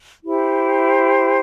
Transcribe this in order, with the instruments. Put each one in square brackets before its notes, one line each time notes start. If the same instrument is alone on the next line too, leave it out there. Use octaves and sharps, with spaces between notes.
[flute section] E4 G4 C5